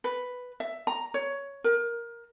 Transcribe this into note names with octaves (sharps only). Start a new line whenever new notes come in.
B4
E5
A#5
C#5
A#4